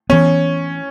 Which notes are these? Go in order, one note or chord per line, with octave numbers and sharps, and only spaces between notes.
E3 B3 C#4